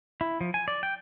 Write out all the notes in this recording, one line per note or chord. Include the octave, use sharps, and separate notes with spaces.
E4
F3
G#5
D5
G5